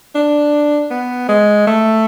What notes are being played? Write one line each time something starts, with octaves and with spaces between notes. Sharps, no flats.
D4
B3
G#3
A3